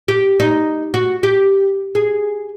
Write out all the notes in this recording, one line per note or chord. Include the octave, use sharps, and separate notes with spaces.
G4
D#4
F#4
G4
G#4